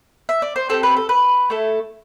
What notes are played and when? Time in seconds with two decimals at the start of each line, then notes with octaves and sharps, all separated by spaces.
0.29 E5
0.42 D5
0.56 C5
0.69 C4 E4 G4 A4
0.83 B4
0.97 A4
1.09 B4
1.50 A3 E4 A4